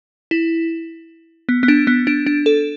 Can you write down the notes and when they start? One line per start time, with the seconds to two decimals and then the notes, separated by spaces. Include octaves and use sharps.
0.31 E4
1.49 B3
1.63 B3
1.68 D4
1.87 B3
2.07 D4
2.26 D4
2.46 A4